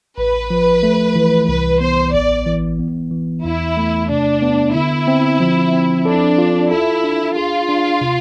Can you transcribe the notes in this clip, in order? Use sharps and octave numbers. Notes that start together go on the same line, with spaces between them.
A1 B4
F3
A3
E3
C2 B4
B3 C5
A1 D5
E3
B3
E3
E2 E4
A3
C3 D4
B3
D3 E4
C4
F3
C4
D4 A4
F4
E4 A4
D4
F4 G#4
D4
C3